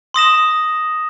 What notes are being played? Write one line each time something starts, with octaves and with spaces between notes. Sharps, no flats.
C6 D#6 A#6 E7